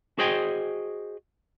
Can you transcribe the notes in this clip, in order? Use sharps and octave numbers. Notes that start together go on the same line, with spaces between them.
F#4 G#4 C5 D#5 G5 G#5